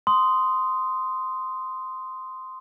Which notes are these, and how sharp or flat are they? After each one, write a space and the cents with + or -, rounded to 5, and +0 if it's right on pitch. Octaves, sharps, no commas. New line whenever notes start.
C6 -10 D#6 +0